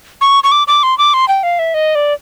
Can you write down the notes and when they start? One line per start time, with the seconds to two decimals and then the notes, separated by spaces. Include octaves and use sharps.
0.21 C#6
0.44 C#6
0.52 D6
0.67 D6
0.83 C6
0.98 D6
1.14 C6
1.28 G5
1.43 F5
1.59 E5
1.74 D#5
1.95 D5